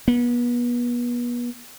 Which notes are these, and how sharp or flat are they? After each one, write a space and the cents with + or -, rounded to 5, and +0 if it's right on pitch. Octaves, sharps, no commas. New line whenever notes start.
B3 -35